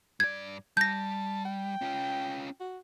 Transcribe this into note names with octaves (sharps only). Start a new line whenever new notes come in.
G2 D5 G#6
G3 A5 G6 A#6
G5
C#4 F4
F#4